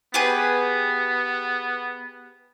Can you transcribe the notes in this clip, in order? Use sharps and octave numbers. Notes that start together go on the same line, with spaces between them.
B3 G4 G#4 B4